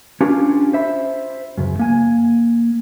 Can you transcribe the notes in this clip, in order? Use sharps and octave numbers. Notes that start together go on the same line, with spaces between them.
C#4 D4 F4 G4 A#4
C5 E5 B5
C#2 F#2
A#3 G#5